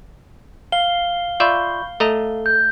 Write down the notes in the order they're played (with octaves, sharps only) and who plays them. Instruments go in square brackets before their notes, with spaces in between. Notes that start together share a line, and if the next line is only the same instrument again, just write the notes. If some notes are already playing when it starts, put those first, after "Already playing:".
[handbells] F5 [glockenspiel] G7
[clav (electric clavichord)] F4 D5 E5 [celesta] B5 C#6 G6
[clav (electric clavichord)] A3 D#5 A#5 [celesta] A4
[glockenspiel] G6